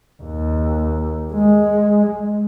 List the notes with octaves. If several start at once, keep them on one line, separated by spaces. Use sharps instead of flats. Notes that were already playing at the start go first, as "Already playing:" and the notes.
D#2
G#3